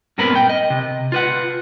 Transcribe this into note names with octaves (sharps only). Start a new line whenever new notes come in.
G2 A#2 B3 C4 A#4 B5
G5
D#5
C3
F4 B4 F#5